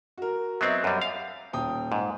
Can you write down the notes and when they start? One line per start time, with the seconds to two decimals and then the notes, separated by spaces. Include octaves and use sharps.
0.18 F#4 A#4
0.61 F#3 B3 C4 D#5 E5
0.84 F#2 G3
1.01 F5
1.53 D#1 G5 D#6
1.92 G#2